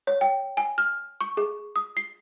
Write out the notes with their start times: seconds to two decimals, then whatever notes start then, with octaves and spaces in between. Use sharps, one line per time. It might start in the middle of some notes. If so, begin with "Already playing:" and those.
0.07 C#5
0.21 G5
0.57 G#5
0.78 F6
1.21 C#6
1.37 G#4
1.76 D#6
1.97 C7